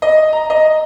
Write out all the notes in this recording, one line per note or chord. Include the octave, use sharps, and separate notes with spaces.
D#5
A#5
D#5